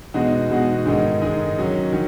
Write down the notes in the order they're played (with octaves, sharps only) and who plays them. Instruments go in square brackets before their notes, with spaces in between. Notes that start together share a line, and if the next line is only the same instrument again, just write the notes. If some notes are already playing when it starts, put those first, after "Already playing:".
[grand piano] E2 B2 G#3 D#4 F#4
E2 B2 G#3 D#4 F#4
G#2 D#3 G#3 D#4
G#2 D#3 G#3 D#4
D#3 F#3 C#4
D#3 F#3 C#4